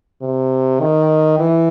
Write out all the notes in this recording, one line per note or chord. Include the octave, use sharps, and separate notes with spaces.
C3
D#3
E3